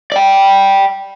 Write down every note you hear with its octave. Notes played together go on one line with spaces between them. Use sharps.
D5 G5